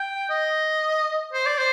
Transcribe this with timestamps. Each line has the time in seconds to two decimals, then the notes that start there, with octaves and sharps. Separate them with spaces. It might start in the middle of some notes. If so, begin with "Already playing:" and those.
Already playing: G5
0.30 D#5
1.33 C5
1.46 D5
1.58 C5